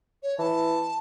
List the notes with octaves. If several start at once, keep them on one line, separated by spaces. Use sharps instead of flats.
C#5
E3 A5